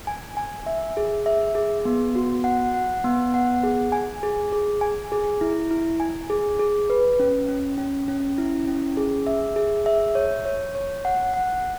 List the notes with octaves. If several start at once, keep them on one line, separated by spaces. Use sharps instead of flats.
G#5
G#5
E5
G#4
E5
G#4
B3
F#4
F#5
F#5
B3
F#5
G#4
G#5
G#4
G#4
G#5
G#4
E4
E4
G#5
G#4
G#4
B4
C#4
C#4
C#4
C#4
E4
C#4
G#4
E5
G#4
E5
C#5
C#5
C#5
F#5
F#5